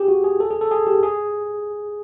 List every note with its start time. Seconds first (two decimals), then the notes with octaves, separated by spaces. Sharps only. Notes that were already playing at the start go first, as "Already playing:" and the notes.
Already playing: G4 G#4
0.08 F#4
0.24 G#4
0.40 A4
0.51 G#4
0.61 A4
0.71 G#4
0.87 G4
1.03 G#4